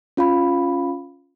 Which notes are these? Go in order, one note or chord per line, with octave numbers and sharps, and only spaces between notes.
C#4 F4 F5 B5